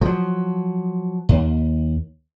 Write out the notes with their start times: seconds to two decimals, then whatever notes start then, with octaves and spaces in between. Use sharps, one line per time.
0.01 F3 F#3
1.29 D#2